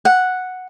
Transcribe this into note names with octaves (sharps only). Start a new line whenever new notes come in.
F#5